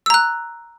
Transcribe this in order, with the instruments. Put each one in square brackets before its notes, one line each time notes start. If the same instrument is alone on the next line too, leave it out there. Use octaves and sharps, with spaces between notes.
[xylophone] E6
A#5
F#6